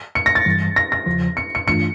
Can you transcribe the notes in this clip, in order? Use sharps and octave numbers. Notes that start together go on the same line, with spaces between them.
C#7
A#6
A6
G2 E3 G3
A#6
A#6
E2 C#3 F3
C#7
C#7
G2 E3 A3 D4 F4 C#7